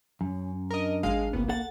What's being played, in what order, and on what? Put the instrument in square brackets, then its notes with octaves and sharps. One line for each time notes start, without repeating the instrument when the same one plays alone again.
[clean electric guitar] F#2 [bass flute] C#4
[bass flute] D4 [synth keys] A#4 D#5
[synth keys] G#1 G#3 F5
[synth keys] G1 C2 B3 [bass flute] A#3
[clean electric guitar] A4 F#5 [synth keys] A6